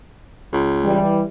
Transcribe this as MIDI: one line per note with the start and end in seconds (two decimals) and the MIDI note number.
0.53 1.01 37
0.83 1.22 52
0.83 1.22 55